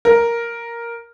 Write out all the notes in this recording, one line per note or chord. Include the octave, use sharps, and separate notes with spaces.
A#4